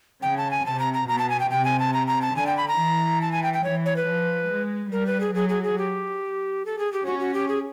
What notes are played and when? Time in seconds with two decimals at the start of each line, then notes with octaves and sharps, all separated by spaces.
0.22 C#3 G5
0.37 A5
0.51 G#5
0.65 C3 A5
0.79 A#5
0.94 A#5
1.08 B2 A#5
1.18 A5
1.30 G#5
1.40 G5
1.51 C3 G5
1.65 G#5
1.79 A5
1.94 A#5
2.07 A#5
2.22 A5
2.36 D3 G#5
2.47 G5
2.57 B5
2.68 A#5
2.79 E3
3.21 A5
3.32 G#5
3.43 G5
3.54 G5
3.64 E3 C#5
3.86 C#5
3.96 B4
4.07 F3
4.50 G#3
4.92 G3 A#4
5.06 B4
5.20 G#4
5.35 F#3 G#4
5.49 G#4
5.64 G#4
5.78 G4
6.66 A4
6.79 G#4
6.93 G4
7.05 C#4 F#4
7.20 F#4
7.34 G4
7.48 G#4